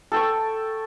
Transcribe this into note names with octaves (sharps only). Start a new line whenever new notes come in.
A4 G5 C#6